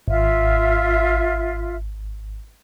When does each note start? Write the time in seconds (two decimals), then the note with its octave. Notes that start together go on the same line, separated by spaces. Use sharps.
0.08 G#1 F4 E5